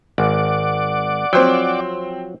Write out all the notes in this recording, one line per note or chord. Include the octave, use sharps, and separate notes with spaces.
G#1 D5 F#5 D6
F3 F#3 C4 C5 G5